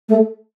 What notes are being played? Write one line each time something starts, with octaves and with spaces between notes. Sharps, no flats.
A3